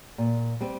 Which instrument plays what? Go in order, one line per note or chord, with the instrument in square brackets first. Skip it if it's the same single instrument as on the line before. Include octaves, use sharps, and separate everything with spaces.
[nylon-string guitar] A#2
G3 C4